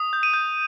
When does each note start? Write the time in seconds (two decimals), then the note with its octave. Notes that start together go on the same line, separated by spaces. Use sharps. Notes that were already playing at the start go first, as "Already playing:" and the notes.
Already playing: D#6
0.13 G6
0.23 D#7
0.34 G6